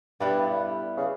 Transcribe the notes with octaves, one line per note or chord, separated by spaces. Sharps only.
G2 G3 B3 E4 A4
C#3